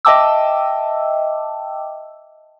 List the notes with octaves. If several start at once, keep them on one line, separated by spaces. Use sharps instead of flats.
D#5 E5 G5 A5 D6 E6